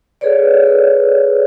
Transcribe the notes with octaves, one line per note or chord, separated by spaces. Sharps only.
G#4 A4 B4 C#5 D5